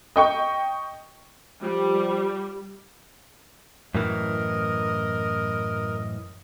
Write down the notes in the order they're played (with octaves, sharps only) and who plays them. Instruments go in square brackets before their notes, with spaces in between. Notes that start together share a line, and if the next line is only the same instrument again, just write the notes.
[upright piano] D#5 G5 C#6
[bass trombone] F3 [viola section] G3
[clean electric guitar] F#2 A2 E3 [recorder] A#4 [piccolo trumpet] D#5